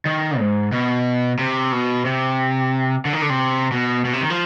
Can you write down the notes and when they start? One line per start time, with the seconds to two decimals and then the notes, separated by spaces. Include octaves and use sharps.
0.06 D#3
0.39 G#2
0.72 B2
1.39 C3
1.72 B2
2.05 C3
3.05 D3
3.13 D#3
3.22 D3
3.30 C3
3.72 B2
4.05 B2
4.13 C3
4.21 D#3
4.30 F3